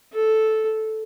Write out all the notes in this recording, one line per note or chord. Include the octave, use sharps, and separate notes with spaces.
A4